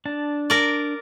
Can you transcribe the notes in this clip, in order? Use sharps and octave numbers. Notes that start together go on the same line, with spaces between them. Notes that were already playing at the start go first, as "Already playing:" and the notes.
D4 A5
A#4 D5